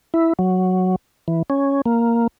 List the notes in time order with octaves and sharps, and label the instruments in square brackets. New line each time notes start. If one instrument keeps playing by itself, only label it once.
[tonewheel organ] E4
F#3
E3
C#4
A#3